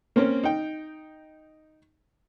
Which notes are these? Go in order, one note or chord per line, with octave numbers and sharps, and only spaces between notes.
A#3 C4 C#4
D#4 G5